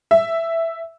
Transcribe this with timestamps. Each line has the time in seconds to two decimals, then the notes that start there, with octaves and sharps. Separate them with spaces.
0.11 E5